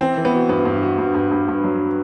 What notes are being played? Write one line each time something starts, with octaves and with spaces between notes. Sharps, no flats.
E3 C4
E3
B3
F#4
G2 B3
G2
F#4
G2
G2
G2
G2
F#3